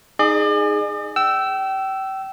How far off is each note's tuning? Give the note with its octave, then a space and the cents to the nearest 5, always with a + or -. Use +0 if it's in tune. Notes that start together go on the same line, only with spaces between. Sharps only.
D#4 +0 G#4 +0 D5 +45
G5 -30 E6 +5